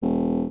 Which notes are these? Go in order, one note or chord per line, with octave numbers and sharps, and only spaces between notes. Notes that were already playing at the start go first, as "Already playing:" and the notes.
E1